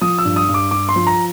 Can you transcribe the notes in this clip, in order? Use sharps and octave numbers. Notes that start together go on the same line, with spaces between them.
F3 D#6
E6
G2
D#6
G2
D6
G2 D6
C6
F3
A#5